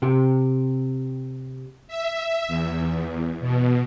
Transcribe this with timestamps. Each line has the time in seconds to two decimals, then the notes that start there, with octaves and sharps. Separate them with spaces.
0.02 C3 G4
1.88 E5
2.48 E2
3.40 B2